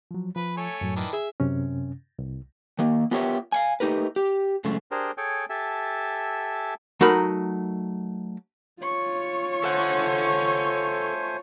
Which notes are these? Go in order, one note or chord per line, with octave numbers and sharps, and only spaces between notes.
F3 F#3
F3 B4
A3 C#5 G#5
F#2 A2 F#3
D#3 E3 D4
G#4 E5
F#2 C3 C#4
C2
D#3 A#3
B3 F4 G4 A#4 C#5 E5
F5 F#5 G#5
A3 D#4 G4 A#4 B4
G4
F#2 C#3 G#3 A3
D4 G4 G#4 A#4 C5
G#4 A4 C#5 G5 G#5
G4 A4 E5 G#5 A5
F#3 A3 D#4 A#4 B5
F4 C#5 C#6
A3 A4 C5 F#5 G#5